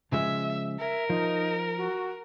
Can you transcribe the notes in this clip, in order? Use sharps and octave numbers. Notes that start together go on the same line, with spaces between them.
C#3 F3 G#3 E5
A#4 E5
F3 D#4
F#4